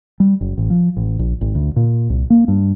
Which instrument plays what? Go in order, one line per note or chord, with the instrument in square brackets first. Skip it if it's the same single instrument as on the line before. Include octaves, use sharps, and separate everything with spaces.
[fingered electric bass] G3
F#1
A1
F3
A1
A#1
G#1
D2
A#2
C2
A#3
G2